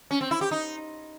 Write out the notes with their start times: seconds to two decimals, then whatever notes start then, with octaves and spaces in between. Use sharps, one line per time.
0.11 C#4
0.21 C4
0.31 E4
0.41 G4
0.51 D#4